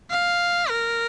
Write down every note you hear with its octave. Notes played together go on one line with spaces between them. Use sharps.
F5
A#4